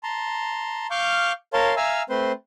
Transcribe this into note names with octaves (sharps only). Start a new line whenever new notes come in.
A5 A#5 C6
F5 C#6 D6 F6 G6
A#4 C#5 F5 A5 C6
E5 F5 G#5 A#5 E6 F6
A3 C4 B4 C5 C6